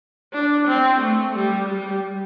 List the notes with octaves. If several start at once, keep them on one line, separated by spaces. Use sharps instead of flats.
D4
C4
A3
G3
G3